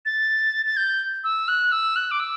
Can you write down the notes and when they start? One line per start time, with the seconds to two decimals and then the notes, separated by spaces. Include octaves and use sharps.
0.06 A6
0.66 A6
0.77 G6
1.24 E6
1.48 F#6
1.72 E6
1.96 F#6
2.11 D6
2.20 E6